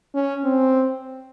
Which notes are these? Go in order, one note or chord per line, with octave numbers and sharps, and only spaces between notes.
C#4
C4